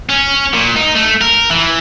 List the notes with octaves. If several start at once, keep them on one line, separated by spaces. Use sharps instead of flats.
C#4
A#2
D#4
A3
A#4
E3